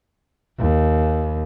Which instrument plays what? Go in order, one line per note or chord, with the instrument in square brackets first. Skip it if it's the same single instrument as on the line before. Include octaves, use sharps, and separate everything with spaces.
[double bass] D#2